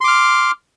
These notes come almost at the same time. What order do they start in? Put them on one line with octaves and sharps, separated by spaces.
C6 D6 F6